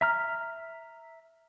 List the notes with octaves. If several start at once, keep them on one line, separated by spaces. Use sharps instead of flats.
E5 A#5 F6